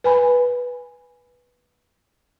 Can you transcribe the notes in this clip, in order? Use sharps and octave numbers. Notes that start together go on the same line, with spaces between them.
B4 G#5 B5